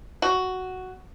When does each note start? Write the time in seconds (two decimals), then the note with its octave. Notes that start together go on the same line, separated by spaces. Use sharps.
0.22 F#4